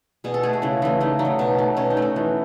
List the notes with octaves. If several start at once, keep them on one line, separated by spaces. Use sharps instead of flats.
B2 G#4
A4
A3 G#4
F#4
C#3 E4
E3 A3
C#3 D#4
F#3 D#4
A3
B2
A3
B2 C#4
D#4
A3
F#4
E3